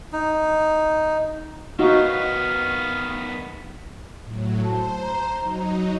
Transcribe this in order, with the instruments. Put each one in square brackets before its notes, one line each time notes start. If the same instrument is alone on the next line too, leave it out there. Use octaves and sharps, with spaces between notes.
[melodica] D#4
[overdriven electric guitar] D#3 B3 [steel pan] D#4 F#4 [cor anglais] F5
[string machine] A2 F#3
[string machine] C5 [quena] A5
[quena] A#5
[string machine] F#3 D#4